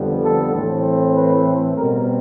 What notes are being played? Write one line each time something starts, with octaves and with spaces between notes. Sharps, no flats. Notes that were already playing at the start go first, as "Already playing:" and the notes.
Already playing: F2 D3 G3 B3
A4
A2 E3 A3 C4
B4
B2 G3 C4 A#4